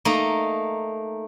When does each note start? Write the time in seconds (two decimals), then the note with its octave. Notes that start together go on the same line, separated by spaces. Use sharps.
0.05 A3 A#3 D#4